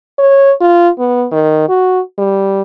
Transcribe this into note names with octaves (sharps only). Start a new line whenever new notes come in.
C#5
F4
B3
D#3
F#4
G3